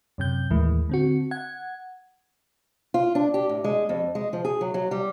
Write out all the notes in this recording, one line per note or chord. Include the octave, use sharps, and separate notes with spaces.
F#2 C3 G6
D#2 A2 E3 G#3
D3 C4 F#4
F#5 G#6
F4
D4
G4
A2
G#3
F2
G#3
F3
G#4
F#3
F#3
G3